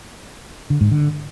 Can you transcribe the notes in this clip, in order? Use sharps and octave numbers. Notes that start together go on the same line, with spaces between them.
D3
G#2
D3